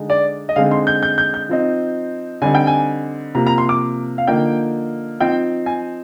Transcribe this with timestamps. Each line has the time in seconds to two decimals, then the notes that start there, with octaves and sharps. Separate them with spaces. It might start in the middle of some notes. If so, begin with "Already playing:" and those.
Already playing: D3 G#3 D#4
0.10 D5
0.49 D#5
0.56 D3 G#3 C4 D#4 F5
0.71 C6
0.87 G6
1.03 G6
1.18 G6
1.34 G6
1.49 F3 C4 D#4
2.42 D3 G3 C4 D#4 G#5
2.55 G5
2.67 G#5
3.35 C3 F3 A#3 A#5
3.47 A#5
3.58 C6
3.69 D6
4.18 F5
4.27 D3 F3 A#3 D#4 G5
5.20 F3 C4 D#4 G5
5.66 G#5